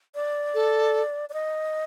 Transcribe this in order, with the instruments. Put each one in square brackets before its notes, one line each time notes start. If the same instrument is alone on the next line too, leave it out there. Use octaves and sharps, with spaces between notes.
[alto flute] D5
[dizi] A4
[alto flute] D5
D#5